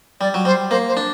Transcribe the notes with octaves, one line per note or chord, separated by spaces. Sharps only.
G3 D5
F#3
G3 C5
A#3 C5
C5
D4